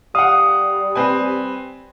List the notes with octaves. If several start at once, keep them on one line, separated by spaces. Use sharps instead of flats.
G3 F5 F#5 D#6
C4 B4 G#5